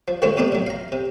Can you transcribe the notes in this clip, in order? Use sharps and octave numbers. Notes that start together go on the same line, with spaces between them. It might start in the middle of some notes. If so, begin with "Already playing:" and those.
F3
D3 D#3 F3 G#3 A3 C#4
E2 C3 A3 C4 D4 D#4
A2 F#3
F5 A#5
C3